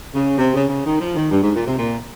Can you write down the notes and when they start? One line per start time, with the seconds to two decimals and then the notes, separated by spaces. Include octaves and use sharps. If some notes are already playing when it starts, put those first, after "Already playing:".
0.14 C#3
0.37 C3
0.54 C#3
0.69 C#3
0.85 D#3
1.00 F3
1.15 D#3
1.31 G2
1.43 G#2
1.55 A#2
1.66 C3
1.78 A#2